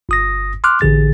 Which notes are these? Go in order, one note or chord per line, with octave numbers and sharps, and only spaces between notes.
G1 D#6 A#6
C6 D6 F6 F#6
A1 D3 G#4 A6